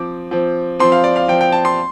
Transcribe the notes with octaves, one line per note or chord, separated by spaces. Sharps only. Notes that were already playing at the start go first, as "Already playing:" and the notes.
Already playing: F3 C4 D6
F3 C4
F3 C4 C6
F5
D5
F5
F3 C4 G5
G5
A5
C6